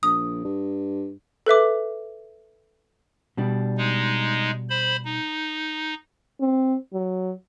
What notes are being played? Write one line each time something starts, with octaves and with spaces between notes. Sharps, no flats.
A#1 D#6
G2
A4 B4 E5 D6
B2 G3 D4
G#3 D#4
C5 B5
D#4
C4
F#3